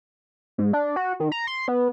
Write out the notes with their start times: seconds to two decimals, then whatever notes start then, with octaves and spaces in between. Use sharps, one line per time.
0.58 G#2
0.73 D4
0.96 F#4
1.20 D#3
1.32 A#5
1.47 C6
1.68 B3